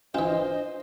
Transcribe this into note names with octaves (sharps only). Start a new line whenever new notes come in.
E3 D4 F4 C5 D#5